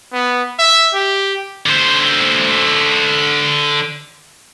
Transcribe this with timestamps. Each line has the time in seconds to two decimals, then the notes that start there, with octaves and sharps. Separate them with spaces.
0.13 B3
0.59 E5
0.94 G4
1.66 D3 C5